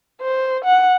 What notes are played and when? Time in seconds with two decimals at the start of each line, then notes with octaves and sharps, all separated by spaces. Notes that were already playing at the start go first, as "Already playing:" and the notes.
0.21 C5
0.65 F#5